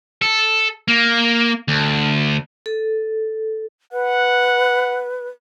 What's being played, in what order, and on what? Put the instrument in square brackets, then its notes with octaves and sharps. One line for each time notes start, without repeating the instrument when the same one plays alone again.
[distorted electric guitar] A4
A#3
D2
[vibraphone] A4
[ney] B4 [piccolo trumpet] F#5